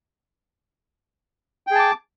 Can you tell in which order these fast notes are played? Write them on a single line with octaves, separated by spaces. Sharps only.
G5 G#4 A5 D6